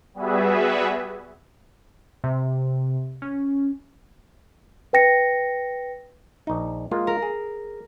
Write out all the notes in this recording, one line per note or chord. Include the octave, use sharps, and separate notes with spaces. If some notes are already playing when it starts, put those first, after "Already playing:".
G3 B3 F#4 G#4 B4 E5
C3
C#4
B4 G5 A#6 C#7
A#1 D#4
G#3 A#3 F4
A#4
G#4